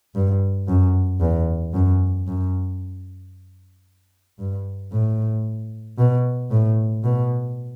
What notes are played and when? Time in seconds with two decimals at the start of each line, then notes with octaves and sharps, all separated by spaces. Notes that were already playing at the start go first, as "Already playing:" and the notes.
0.15 G2
0.67 F#2
1.20 E2
1.74 F#2
2.27 F#2
4.39 G2
4.92 A2
5.98 B2
6.51 A2
7.04 B2